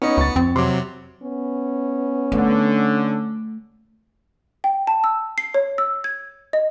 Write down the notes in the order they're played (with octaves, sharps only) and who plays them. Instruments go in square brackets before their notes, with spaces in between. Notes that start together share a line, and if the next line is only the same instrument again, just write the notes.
[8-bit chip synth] B3 C#7 [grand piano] C#4 D#4 C#5
[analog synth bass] D2 [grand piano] C#6 A6
[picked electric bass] F2 [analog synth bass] C4
[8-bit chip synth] C3 F#3 [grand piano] C6 D6
[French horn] B3 [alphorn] C#4
[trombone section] D3 [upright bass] A3
[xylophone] G5
A5
E6
C7
C#5
E6
G#6
D#5